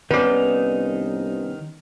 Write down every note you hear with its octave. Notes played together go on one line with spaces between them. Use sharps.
C2 D#3 B3 C#4 D#4 B4 D5